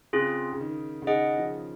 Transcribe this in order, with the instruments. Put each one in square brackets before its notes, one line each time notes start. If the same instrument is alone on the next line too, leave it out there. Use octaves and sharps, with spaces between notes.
[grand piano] C#3 [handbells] C4 F4 G#4
[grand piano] C#3
D#3
C#3
[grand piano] D#3 [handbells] G#4 D#5 F#5
[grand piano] F3